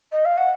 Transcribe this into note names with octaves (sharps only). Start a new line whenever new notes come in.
D#5
F5
F#5